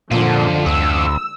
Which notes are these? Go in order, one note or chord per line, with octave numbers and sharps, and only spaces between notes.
A#2 D3 F3 F4 A4
D2 E6